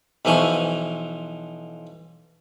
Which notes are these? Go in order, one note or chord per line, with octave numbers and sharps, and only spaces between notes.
B1 E3 F3 G#5 C#6